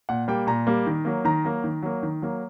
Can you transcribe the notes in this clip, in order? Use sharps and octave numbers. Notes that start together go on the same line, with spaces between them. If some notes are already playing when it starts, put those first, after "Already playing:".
A#2 F#5
G3 A#3 G5
A#2 A#5
G3 A#3
D#3
F#3 A#3
D#3 A#5
F#3 A#3
D#3
F#3 A#3
D#3
F#3 A#3